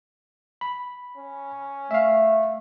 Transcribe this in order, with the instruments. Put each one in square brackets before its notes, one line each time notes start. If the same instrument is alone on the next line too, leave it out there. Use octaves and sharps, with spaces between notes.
[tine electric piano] B5
[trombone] C#4
[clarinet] A3 [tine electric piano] E5 F5